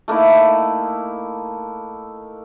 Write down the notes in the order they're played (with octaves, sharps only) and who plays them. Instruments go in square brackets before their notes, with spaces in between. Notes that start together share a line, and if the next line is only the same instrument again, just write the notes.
[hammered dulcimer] A3 A#3 D#4 E4